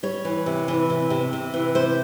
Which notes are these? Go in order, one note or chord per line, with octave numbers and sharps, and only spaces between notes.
G3 C#5
E3
C3
E3
C3
C3
C3
E3
C3 C5